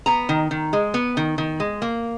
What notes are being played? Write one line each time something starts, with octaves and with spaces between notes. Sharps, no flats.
B3 A#5
D#3
D#3
G#3
B3
D#3
D#3
G#3
A#3